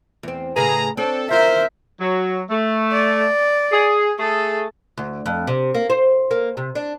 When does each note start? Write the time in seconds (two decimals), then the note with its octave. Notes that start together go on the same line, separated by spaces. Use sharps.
0.23 E2 C4
0.56 A2 C#3 G#4 B4 A#5
0.97 C4 D4 A4 C#5
1.31 F4 A#4 C5 E5
2.01 F#3
2.50 A3
2.92 D5
3.72 G#4
4.19 A3 G#4 A4
4.97 D2
5.26 F2
5.47 C3
5.74 A#3
5.90 C5
6.31 A#3
6.57 C3
6.75 D4